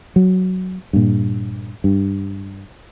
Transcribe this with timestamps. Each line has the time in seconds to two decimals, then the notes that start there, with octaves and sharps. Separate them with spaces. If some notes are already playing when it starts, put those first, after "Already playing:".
0.16 F#3
0.93 G2 A#2
1.84 G2